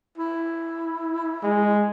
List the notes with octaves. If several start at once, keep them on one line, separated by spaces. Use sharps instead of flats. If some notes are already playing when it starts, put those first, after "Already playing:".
E4
G#3